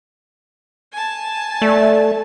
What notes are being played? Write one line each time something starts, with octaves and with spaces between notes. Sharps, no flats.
G#5 A5
A3 D5